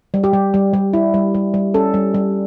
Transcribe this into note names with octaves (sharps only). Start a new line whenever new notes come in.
G3
G4
G3
G3
G3
E4
G3
G3
G3
C#4 A4
G3
G3